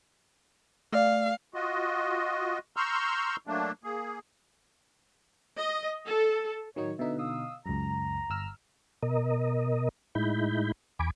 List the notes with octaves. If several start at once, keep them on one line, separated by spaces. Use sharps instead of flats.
A3 D5 F5
F4 F#4 D#5
A#5 C6 C#6 E6 F6 G6
F#3 A3 A#3 D4
A#3 G#4
D#5
A4
A2 D#3 F#3 D#4 C#5
B2 D3 D#4 B4 E5
F5 D#6 E6
C#2 F#2 A#5
G1 E6 F6
B2 A#4 D#5
A2 G#3 D#4 E4 B5 G6
E2 G#5 B5 D6